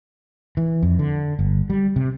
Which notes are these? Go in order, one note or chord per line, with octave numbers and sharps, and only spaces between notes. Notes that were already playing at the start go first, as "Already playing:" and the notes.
E3
F2
D3
G1
G3
C3